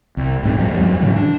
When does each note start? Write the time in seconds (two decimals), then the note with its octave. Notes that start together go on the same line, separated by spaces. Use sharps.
0.17 C2
0.43 D1 G#2 A#3 C4
0.59 F2 F3 G3
0.78 E2 G2 F3 F#3
1.01 G#2 C#3 E3 F#3
1.16 D4